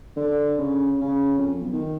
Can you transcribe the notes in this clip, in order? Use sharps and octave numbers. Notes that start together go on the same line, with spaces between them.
D3
C#3
C#3
F2
B1
D#3